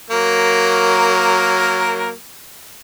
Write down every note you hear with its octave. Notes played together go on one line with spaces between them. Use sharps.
F#3 A#3 A#4